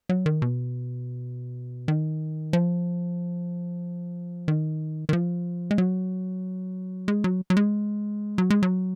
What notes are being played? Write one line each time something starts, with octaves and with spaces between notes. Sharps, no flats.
F#3
D#3
B2
D#3
F3
D#3
D#3
F3
G#3
F#3
G#3
F#3
F#3
G#3
F#3
G#3
F#3